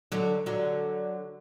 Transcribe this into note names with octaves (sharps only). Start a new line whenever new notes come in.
D3 F#3
D3 F#3